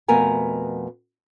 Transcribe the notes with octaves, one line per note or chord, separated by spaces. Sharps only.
F2 B2 A3 B3 A#4 G#5